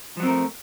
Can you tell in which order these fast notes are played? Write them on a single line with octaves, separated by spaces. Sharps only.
F3 F#3 C4 A#4 A3